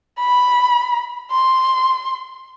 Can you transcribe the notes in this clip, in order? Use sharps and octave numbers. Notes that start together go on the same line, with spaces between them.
B5
C6